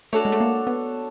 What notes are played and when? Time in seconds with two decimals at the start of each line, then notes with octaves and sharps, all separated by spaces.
0.13 A3 D4 F#4 A4 C#5
0.25 G#3
0.32 A3
0.40 A#3
0.67 B3